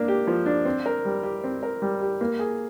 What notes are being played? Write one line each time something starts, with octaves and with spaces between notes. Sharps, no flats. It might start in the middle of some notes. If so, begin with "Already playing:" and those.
Already playing: A#3 D4
G4
F3
D4
C4
A#4
G3
G4
C4
A#4
G3
G4
A#3
G#4